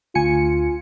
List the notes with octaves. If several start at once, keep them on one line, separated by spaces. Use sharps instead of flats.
D2 F4 G#5 C#7